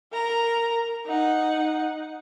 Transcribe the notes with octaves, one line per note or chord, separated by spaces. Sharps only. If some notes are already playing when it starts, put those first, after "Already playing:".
A#4 A#5
D#4 F#5